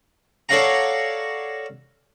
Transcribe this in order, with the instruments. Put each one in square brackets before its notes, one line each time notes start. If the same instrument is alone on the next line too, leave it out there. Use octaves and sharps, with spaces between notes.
[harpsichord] A4 C#5 D5 F5 F#5 A#5